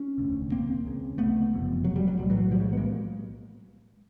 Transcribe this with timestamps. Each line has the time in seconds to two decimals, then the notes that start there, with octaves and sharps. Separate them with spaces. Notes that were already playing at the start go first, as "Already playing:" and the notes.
Already playing: C#4
0.18 E1 D2 C3
0.52 A#3 C4
0.85 C#2 C#3
1.18 A3 B3
1.52 F#1 F2 C3
1.84 F#3
1.96 G3
2.08 F#3
2.18 B1 A2 G3
2.30 E3 F#3
2.51 F3 G3
2.60 F#3 G#3
2.73 B3
2.77 G#3 A#3